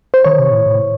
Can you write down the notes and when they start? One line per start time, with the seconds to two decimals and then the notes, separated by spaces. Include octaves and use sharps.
0.14 C5
0.24 D#3 C#5
0.39 C3
0.51 A2
0.66 A2